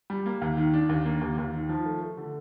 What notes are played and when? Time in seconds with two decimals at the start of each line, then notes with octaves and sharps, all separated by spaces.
0.10 G3
0.26 A#3
0.41 D#2
0.57 D#3
0.74 D4
0.89 D#2
1.05 A#3
1.21 D#2
1.38 D#2
1.53 D#3
1.69 F3
1.86 A3
2.02 A3
2.17 D3